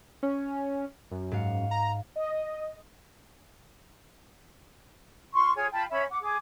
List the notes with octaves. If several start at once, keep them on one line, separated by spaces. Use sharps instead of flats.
C#4
F#2
G#2 F5 C#7
A#5
D#5
F4 C6 C#6
F4 G#4 C#5 G#5
F4 G5 A5 B5
C#4 C#5 E5 B5
F#5 D6
G#4 D6